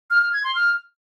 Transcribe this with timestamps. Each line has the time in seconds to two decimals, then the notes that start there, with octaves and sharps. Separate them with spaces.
0.10 F6
0.22 F6
0.33 G#6
0.44 C6
0.55 F6